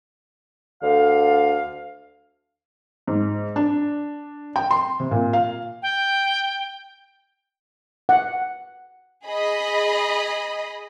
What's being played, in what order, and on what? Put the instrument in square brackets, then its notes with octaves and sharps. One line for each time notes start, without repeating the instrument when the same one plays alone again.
[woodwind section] D2 D3 F5
[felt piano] G#2
D4
G5
C6
C3
A#2
F5
[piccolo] G5
[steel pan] F#5
[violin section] G#4 D#5 B5